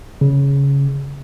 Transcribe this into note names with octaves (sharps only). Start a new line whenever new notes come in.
C#3